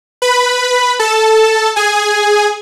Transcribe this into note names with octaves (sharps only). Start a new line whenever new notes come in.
B4 B5
A4 A5
G#4 G#5